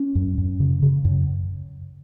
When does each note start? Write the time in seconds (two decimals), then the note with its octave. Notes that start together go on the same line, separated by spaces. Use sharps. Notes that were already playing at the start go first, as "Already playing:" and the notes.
Already playing: C#4
0.15 F#2
0.38 F#2
0.60 C#3
0.82 C#3
1.05 F#2